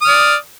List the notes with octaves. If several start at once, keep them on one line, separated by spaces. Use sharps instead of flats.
D5 D#6 F6